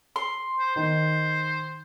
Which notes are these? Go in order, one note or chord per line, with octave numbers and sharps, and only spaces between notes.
C6
C5
D#3 C5